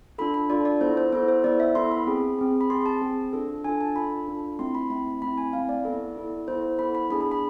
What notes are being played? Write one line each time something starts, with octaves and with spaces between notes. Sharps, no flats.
D4 F4 A4 B5
B5
D4 F4 A4 D5
D5
B3 E4 A4 C5
C5
B3 E4 A4 C5
C5
B3 E4 A4 D5
E5
B3 E4 A4 C6
B5
C4 G#4
C4 G#4
B5
C4 G#4 C6
A5
C4 G#4
D4 F4 A4
D4 F4 A4 G#5
A5
D4 F4 A4 B5
D4 F4 A4
A3 C4 E4 C6
B5
A3 C4 E4 B5
A3 C4 E4 B5
G#5
A3 C4 E4 F5
D5
B3 E4 A4
B3 E4 A4
B3 E4 A4 C5
B3 E4 A4 B5
B5
B3 D4 G#4 B5
B5
B5